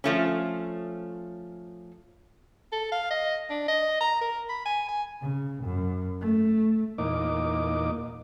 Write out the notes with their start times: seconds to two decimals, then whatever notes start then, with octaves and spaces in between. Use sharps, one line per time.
0.04 F3 A3 C#4
2.72 A4
2.92 F5
3.10 D#5
3.50 D4
3.68 D#5
4.00 A#5
4.21 A#4
4.49 B5
4.65 G#5
4.88 G#5
5.22 C#3
5.64 F#2
6.21 A3
6.98 E2 A#2 A#3 D#4 D#5 D6